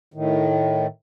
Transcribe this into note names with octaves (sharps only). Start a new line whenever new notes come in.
A2 D#3